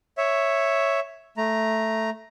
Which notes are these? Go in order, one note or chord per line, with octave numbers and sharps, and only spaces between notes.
C#5 E5
A3 A#5